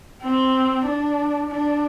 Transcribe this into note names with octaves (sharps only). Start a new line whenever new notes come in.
C4
D4
D4